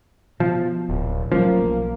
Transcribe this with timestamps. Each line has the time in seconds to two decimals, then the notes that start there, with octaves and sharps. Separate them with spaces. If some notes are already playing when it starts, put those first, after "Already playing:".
0.40 B2 F3
0.89 D1
1.32 F3 F#3 A3 A#3 C#4
1.61 B1